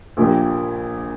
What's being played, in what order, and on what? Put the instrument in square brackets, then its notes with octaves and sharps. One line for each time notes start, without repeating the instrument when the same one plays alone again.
[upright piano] A#1 A#2 A#3 G4